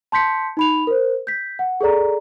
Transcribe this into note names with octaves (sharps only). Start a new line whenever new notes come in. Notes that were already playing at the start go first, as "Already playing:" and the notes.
A5 C6 G6 B6 C#7
D#4 B5 F7
A#4 C5
G6 B6
F#5
G#4 A4 C#5 D5 A#5